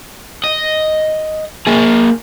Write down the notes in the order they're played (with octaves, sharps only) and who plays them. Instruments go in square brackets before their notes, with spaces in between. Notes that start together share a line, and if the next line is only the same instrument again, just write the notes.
[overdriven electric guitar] D#5
A#3 G#4